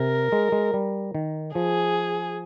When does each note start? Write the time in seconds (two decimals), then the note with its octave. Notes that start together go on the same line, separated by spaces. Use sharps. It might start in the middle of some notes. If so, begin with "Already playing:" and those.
Already playing: C3 A#4
0.32 G#3
0.52 G#3
0.74 G3
1.15 D#3
1.55 F3 G#4